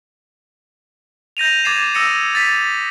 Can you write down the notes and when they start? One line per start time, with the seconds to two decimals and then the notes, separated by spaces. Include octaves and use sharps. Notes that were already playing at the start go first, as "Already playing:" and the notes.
1.37 G6 A#6 D#7 F7
1.64 D6 G#6 A6 C7 D#7 E7
1.94 D#6 E6 A#6 C#7 D#7
2.35 A6 B6 D#7